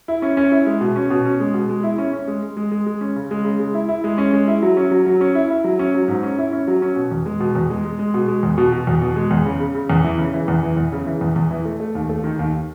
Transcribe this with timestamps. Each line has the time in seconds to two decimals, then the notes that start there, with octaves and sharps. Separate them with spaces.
0.08 E4
0.22 C#4
0.37 C#4
0.52 E4
0.66 G#3
0.81 B2
0.96 C#4
1.10 B2
1.25 C#4
1.40 G#3
1.54 B2
1.69 G#3
1.83 E4
1.98 C#4
2.13 C#4
2.28 G#3
2.43 G#3
2.57 G#3
2.72 G#3
2.86 G#3
3.01 C#4
3.16 C#3
3.31 G#3
3.45 C#3
3.60 G#3
3.74 E4
3.89 E4
4.04 G#3
4.18 C#4
4.33 G#3
4.48 E4
4.62 F#3
4.77 C#4
4.91 F#3
5.06 F#3
5.21 C#4
5.35 E4
5.50 E4
5.64 F#3
5.79 C#4
5.94 F#3
6.08 G#2
6.23 C#4
6.38 E4
6.53 C#4
6.68 F#3
6.82 C#4
6.96 B2
7.11 E2
7.26 G#3
7.40 B2
7.55 E2
7.70 G#3
7.85 G#3
7.99 G#3
8.14 B2
8.28 G#3
8.43 E2
8.58 B2
8.72 B2
8.87 E2
9.02 B2
9.16 G#3
9.31 E2
9.45 C#3
9.60 C#3
9.75 C#3
9.90 E2
10.04 E3
10.19 C#3
10.34 E3
10.48 E2
10.63 E3
10.77 E2
10.92 C#3
11.06 E3
11.21 E2
11.36 E2
11.51 E3
11.65 A3
11.80 A3
11.95 D#2
12.09 A3
12.24 D#3
12.39 D#2